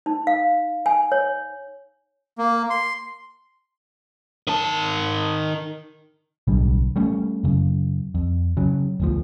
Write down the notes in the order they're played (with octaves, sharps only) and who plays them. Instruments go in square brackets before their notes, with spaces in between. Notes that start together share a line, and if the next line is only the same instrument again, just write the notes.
[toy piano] D#4
F5
G#5
C#5
[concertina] A#3
C6
[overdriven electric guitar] D#3 A5
[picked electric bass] D1 B1 D3 G3
G3 A3 C#4
F#2 C#3
F2
C#3 F#3
G1 D2 F3